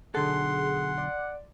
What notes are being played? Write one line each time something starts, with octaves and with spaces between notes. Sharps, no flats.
B1 D3 G#4 A4 F#5 C6
D5